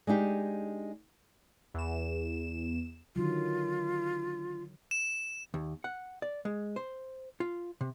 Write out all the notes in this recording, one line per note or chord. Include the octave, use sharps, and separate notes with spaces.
G#3 D4 D#4 G4
E2 E7
D3 D#3 F#3 F4
E7
D#2
F#5
D5
G#3
C5
F4
C3